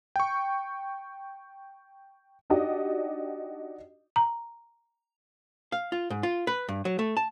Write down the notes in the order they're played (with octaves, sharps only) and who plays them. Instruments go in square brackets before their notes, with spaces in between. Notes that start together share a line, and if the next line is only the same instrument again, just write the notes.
[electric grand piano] G5 C#6
[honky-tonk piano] D4 D#4 F#4 G4 D5 D#5
[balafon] A#5
[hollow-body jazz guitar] F5
F4
G#2
F4
B4
G2
F#3
A3
A5